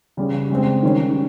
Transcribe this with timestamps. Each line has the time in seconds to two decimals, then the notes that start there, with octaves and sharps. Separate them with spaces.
0.17 C#3 G3 C#4
0.50 C#3 G#3 C4
0.83 D#3 G3 C#4